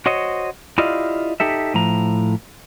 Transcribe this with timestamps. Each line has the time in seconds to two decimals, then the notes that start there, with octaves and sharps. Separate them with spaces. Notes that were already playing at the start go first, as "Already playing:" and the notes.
0.06 F#4 C5 C#5 D#5
0.78 E4 F4 G4 D5 D#5 F5
1.40 D#4 G4 A4 E5
1.74 A2 F3 A#5